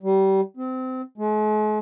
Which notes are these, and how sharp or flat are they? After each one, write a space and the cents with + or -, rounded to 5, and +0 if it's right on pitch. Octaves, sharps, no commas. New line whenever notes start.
G3 -25
C4 -25
G#3 +45